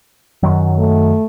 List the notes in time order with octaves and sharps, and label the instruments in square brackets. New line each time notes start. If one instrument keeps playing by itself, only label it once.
[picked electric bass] F#2 D#3 F#3
[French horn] A3